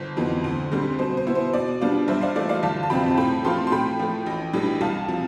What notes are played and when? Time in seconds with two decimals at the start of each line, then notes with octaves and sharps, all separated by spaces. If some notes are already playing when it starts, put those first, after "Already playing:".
Already playing: G1 C5
0.17 F2 E3 B3
0.44 D2
0.72 D3 G3 C4
0.98 B2 C5
1.17 C5
1.27 B3 E4
1.35 C5
1.53 B2 D5
1.81 G3 B3 D4 F4
2.08 G2 C5 E5
2.21 D5 F5
2.36 E3 A3 D5
2.49 D5 F5
2.63 G1 F5 A5
2.83 A5
2.90 F2 C3 F3 C4 G5 B5
3.08 A5
3.17 A2 G5 B5
3.44 F3 A3 C4 F4 A5 C6
3.67 C6
3.72 A2 G5 B5
3.99 F3 A3
4.26 A1
4.53 A2 E3 G3 D4
4.81 C2 F5 A5
5.08 C3 F3